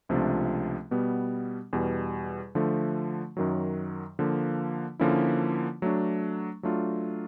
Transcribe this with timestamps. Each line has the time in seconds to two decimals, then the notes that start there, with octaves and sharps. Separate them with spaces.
0.09 C#2 C3 F3 A3 D4
0.91 B2 G3 B3
1.73 E2 B2 G3
2.55 D3 F3 A3
3.37 F#2 D#3 F#3
4.19 D3 F3 A#3
5.00 D3 F3 A#3 C#4 E4
5.82 F#3 A3 D4
6.63 F#3 A3 D4 F4